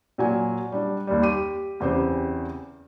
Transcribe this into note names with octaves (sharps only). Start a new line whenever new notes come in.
A#2 F#3 G#5
G3 D4
D#2 G3
G4 D#7
E2 C#3 C4 G4 C5